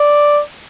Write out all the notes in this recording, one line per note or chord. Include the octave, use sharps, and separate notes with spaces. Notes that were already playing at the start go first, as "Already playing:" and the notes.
Already playing: D5